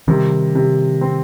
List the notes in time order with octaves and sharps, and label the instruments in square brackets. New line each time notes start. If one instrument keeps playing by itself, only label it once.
[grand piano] C3 [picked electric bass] D#3 G3
[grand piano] C3
C4